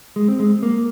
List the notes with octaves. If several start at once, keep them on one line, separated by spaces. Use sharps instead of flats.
G#3
C4
G#3
A#3